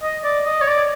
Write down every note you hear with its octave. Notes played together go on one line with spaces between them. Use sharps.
D#5
D5
D#5
C#5
D5